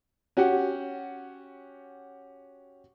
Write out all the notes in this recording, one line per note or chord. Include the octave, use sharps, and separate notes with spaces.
C#4 F#4 G4 F#5